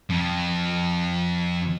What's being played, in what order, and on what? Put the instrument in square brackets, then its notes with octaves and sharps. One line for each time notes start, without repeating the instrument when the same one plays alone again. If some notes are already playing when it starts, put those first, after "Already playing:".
[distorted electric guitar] F2 F3